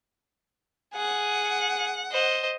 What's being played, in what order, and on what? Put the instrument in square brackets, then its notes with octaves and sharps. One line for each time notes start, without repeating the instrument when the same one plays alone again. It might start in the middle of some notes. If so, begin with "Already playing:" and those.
[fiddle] G#4 [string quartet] F#5
[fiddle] C5 D#5